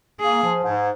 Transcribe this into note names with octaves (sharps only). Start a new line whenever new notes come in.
A#3 G#4
F3
G#2